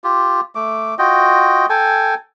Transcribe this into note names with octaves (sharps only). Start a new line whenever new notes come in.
F4 G4
A3 D6
F4 F#4 D#5 G5
A4 G5 G#5